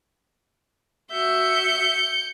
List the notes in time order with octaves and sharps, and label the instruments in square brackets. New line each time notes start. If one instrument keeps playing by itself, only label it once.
[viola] F#4 E5 [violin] G6 C#7